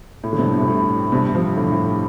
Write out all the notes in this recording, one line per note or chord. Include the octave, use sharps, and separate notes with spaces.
A2
D3
G2 C3
A2
C3
A2
G2 C3
C3 F3
A2 D3
A2